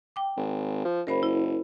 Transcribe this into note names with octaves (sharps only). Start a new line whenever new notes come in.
G5 D6
G#1
F3
F#1 A#4 C5 B5
E4